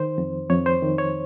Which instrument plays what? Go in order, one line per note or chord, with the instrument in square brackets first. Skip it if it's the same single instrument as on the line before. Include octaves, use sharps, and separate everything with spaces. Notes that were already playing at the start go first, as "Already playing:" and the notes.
Already playing: [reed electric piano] D#3 C5
F2
F2 C#5
C5
D#3
C#5